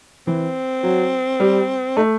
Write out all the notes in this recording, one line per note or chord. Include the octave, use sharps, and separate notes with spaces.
E3 C4
F#3
G3
A3 D#4